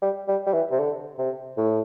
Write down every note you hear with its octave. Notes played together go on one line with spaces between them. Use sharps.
G3
G3
G3
E3
C3
D3
C3
A2